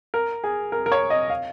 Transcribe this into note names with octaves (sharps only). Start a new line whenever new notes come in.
A#4
G#4
A#4
A#4
C#5
D#5
F5